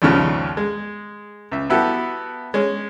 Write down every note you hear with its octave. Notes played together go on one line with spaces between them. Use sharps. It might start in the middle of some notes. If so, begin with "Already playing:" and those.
A#1 D#2 G#2 C#3 F3
G#3
C#2 E5
B3 E4 F#4 G4 A4
G#3 C#4